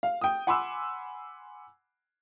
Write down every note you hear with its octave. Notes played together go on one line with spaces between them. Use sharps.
F5
G5 D#6
F#5 G#5 B5 C6 D6 E6